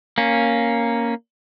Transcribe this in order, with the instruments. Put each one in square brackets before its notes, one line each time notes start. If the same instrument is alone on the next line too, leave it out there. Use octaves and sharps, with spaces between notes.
[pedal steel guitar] A#3 C#4